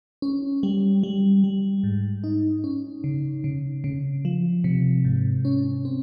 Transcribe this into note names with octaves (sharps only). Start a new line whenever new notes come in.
C#4
G3
G3
G3
G#2
D#4
C#4
C#3
C#3
C#3
F3
C3
G#2
C#4
C4